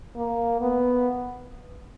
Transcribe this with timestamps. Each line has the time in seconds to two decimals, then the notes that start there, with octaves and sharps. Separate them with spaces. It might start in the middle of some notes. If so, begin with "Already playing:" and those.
0.16 A#3
0.61 B3